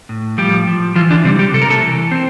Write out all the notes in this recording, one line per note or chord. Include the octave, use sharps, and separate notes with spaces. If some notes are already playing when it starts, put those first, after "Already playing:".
A2
F3 G3 G4
F3
E3 F3 F4
D3 D4
C3 G3 C4
G3 G4
C3 A4
A#4
A3 A4
E3
C4 C5